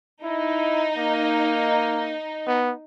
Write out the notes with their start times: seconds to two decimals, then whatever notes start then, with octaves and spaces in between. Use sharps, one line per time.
0.23 D#4 E4
0.98 A#3
2.47 B3